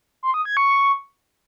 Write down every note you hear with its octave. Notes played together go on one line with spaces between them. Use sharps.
C6
D#6
G#6
C#6